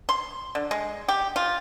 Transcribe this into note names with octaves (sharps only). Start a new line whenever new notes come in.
C6
D3
G#3
G4
F4